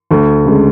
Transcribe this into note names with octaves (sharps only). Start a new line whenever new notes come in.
D2
C#3 G#3